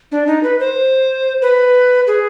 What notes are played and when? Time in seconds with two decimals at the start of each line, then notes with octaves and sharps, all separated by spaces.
0.12 D4
0.27 D#4
0.43 B4
0.60 C5
1.42 B4
2.07 G#4